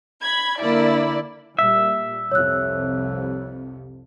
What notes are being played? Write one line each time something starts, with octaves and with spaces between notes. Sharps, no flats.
B5 G#6
D3 A#3 E4 D5
A#2 G3 E5
C2 F2 C3 C#5 E6 F#6